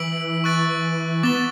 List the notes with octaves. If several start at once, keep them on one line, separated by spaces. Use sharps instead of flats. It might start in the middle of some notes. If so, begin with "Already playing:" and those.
Already playing: E3 E6 B6 D7 F#7
C#6 F#6 A6 D7
B3 D6 A6 E7 G7